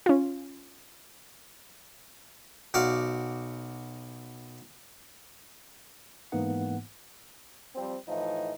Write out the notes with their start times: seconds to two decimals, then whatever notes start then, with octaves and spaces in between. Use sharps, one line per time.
0.06 C#4 F4
2.74 B1 F#4 D5 F5
6.32 G#2 E3 A#3 B3 D#4 F#5
7.75 F3 G3 C4
8.08 A2 E3 F3 D#4